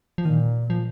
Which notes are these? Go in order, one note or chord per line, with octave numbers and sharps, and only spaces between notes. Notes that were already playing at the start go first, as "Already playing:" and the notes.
F3
A#2 D#3
F3